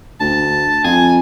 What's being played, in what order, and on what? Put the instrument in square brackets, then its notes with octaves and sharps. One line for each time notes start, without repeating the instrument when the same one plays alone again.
[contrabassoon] D2 [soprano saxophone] A5
[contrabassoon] F2 [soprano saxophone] G#5